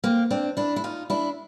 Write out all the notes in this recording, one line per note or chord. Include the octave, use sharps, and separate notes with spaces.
A#3 C4
C4 D4
D4 E4
E4
D#4 F4
D4 E4